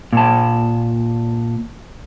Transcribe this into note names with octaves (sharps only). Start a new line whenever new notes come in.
A#2 A5